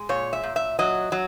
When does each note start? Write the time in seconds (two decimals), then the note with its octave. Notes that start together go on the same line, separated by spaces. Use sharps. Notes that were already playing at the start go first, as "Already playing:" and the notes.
Already playing: G#3
0.09 A#2 C#5
0.33 E5
0.43 A#2
0.56 E5
0.79 F#3 D#5
1.12 F#3